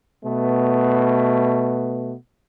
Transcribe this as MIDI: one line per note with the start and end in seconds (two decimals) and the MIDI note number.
0.25 2.15 47
0.25 2.15 57
0.25 2.15 59